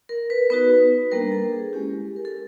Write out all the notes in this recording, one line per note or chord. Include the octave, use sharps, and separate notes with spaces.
A#4
B4
B3 D#4 F#4 B4
G3 A#3 D4 A#4
A4
G#4
G#3 C#4 E4 G4
A#4
A4